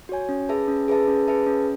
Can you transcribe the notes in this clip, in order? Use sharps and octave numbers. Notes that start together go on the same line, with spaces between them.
F#4 C#5 G#5
C#4
G#4 B4 E5 A5
C#4
G#4 B4 E5 A5
C#4
G#4 B4 E5 A5
C#4